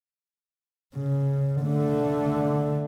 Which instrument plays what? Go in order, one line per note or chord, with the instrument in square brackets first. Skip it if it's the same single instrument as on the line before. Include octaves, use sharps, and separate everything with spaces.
[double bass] C#3
D3 A3